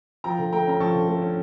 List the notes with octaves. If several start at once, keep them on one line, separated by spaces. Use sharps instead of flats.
F3 G5 A#5
D3
A3 G5 A#5
C#4 A#5
F3 A5 C#6
D3
A3
C#4